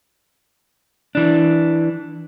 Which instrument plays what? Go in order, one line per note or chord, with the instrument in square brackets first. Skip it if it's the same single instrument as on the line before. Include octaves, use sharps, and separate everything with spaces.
[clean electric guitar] E3 D4